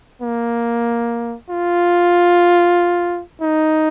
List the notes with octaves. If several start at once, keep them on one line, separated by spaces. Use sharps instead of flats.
A#3
F4
D#4